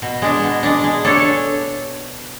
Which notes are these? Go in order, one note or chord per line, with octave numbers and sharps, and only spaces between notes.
B2
G#3 D4
B2
G#3 D4
G#3
D4 A4 C#5